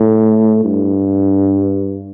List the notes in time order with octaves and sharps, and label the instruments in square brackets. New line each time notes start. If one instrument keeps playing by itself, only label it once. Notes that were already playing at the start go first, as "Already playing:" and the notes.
Already playing: [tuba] A2
G2